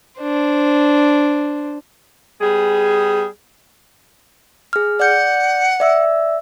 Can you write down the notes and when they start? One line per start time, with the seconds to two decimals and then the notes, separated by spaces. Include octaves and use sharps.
0.20 D4 C5
2.41 G3 B3 G#4
4.73 G#4 F6
5.00 D5 F#5 G6
5.80 D5 E5 E6